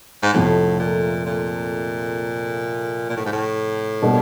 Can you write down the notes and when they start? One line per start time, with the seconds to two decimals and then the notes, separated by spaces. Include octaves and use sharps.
0.23 G#2
0.34 F2 A2 C3 F3 A3
0.79 A#2
1.26 A#2
3.10 A#2
3.17 A2
3.26 G#2
3.32 A2
4.02 B2 G3 A#3 D4